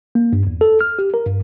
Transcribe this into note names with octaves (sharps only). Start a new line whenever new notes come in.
A#3
G2
E2
A4
F6
G4
A#4
G2